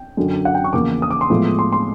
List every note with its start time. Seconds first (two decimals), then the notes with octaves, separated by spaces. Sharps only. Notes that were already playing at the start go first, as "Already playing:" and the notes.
Already playing: G5
0.17 F#2 D3 F#3
0.45 F#5
0.55 G5
0.64 C#6
0.73 E2 C#3 F3 A#3 D6
1.02 D#6
1.11 D6
1.21 C6
1.30 A2 F3 G#3 B3
1.59 C6
1.72 C6